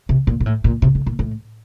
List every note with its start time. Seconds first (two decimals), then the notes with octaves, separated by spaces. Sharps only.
0.09 C3
0.27 A#2
0.40 A#2
0.46 A2
0.64 A#2
0.82 C3
0.95 D3
1.06 A#2
1.19 A2